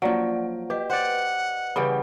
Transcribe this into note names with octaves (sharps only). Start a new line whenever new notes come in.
F3 F#3 A#3 D5 F#5
G4 B4 D#5
C5 D5 F#5
C#3 E3 G3 B4 F#5 B5